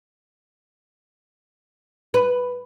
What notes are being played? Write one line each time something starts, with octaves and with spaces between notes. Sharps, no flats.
B4